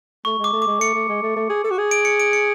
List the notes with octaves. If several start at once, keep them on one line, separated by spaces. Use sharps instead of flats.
A3 C#6
G#3
D6
A3
D6
G#3
A3 C#7
A3
G#3
A3
A3
G#4
A4
F#4
G#4
D7
C#7
D7
C#7